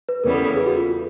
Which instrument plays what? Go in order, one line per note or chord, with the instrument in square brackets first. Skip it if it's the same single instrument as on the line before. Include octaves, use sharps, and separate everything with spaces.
[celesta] B4
[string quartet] E2 C#3 E3 G3 B3 [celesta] A#4
[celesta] A4
A4
G#4
F#4
F4